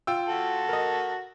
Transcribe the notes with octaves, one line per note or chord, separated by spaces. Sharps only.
F4 G5 E6
F#4 A4
A#4 D#5